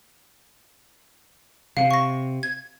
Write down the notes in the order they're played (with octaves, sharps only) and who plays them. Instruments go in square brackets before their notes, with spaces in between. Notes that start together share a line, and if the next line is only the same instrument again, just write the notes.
[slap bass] C3 [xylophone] F5
[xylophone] C#6 A#6
G#6